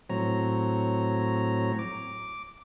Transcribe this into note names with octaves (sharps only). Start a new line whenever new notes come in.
A2 F#3 C4 C#5 A#5
D6